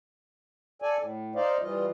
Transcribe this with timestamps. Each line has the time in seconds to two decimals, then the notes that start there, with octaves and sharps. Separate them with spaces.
0.82 A4 D5 G#5
0.98 A2
1.35 D#4 C5 D5 D#5 F5
1.62 E3 G3 F4 D#5